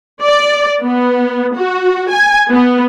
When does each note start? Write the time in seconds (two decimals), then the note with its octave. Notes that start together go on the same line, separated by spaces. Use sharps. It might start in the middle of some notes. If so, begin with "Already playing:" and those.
0.23 D5
0.82 B3
1.56 F#4
2.10 G#5
2.51 B3